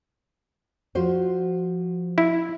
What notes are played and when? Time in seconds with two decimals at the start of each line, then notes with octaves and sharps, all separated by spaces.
0.95 F3 F#4 C5
2.18 E4